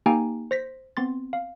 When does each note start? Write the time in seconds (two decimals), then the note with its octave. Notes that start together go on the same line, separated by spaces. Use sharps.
0.06 A#3 D#4 G4 G5 G#5 A#5
0.51 C5 A#6 B6
0.97 B3 C4 C6 A6
1.33 F5